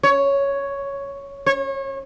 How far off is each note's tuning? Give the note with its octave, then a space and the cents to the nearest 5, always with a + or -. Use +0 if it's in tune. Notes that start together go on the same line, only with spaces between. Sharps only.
C#5 +5
C#5 -30